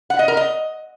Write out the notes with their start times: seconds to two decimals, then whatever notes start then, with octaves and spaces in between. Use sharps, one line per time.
0.10 F#5
0.19 D#5
0.28 A#4
0.37 D#5